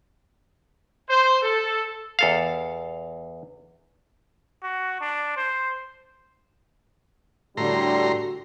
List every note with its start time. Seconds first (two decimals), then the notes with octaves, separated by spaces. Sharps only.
1.10 C5
1.43 A4
2.19 E2 A4 F5
4.63 F#4
5.01 D4
5.36 C5
7.57 A2 D3 G3 F#4 A#5 C6